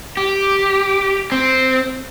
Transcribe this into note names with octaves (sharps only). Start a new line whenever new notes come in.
G4
C4